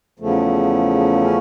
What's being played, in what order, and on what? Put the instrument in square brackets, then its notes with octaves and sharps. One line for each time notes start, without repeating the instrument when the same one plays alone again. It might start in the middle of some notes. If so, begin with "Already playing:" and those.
[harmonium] E2 C#3 F3 A3
C#4